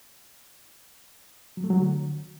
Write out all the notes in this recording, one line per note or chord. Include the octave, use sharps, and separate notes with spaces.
F#3
A3
F#3
D3